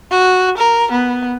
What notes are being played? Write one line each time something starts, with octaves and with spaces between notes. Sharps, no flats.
F#4
A#4
B3